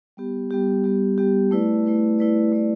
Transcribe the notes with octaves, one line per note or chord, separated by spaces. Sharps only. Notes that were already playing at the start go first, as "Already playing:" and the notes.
G3 B3 G4
G3 B3 G4
G3 B3 G4
G3 B3 G4
A3 E4 B4 D5
A3 E4 B4 D5
A3 E4 B4 D5
A3 E4 B4 D5